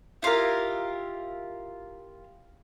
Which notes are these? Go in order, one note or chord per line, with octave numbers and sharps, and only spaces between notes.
E4 F4 G4 A#4